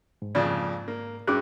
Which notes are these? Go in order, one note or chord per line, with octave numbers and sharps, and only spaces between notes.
G#2
F2 A#2 C#3 D5
A#3
G2 C#4 F#4 G#4 D6 F#6